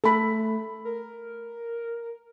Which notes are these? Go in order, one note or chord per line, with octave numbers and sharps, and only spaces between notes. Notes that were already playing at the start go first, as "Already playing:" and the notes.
A3 A4 B5
A#4